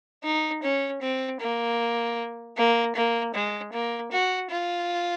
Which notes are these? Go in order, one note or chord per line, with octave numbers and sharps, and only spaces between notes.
D#4
C#4
C4
A#3
A#3
A#3
G#3
A#3
F#4
F4